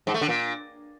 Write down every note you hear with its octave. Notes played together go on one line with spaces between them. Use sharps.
G#2
A3
D3
A#2